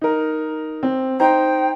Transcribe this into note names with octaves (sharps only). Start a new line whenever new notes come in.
D#4 A#4
C4
D#4 C5 G5 A#5